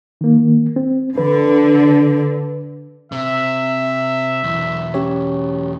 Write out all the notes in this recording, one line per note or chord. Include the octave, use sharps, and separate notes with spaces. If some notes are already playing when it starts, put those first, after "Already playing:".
D#3 A#3
C4
D3 B4
C3 E5
B1 E2
C#4 G4 C#5